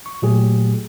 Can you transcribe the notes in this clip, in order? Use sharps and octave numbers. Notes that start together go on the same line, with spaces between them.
C#6
A#2 F#3 A3 G4 G#4